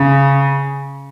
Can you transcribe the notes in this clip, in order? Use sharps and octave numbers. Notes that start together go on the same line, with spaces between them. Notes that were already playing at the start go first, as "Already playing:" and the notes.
Already playing: C#3